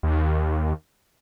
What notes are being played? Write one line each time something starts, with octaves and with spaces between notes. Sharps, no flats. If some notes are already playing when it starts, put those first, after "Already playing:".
D#2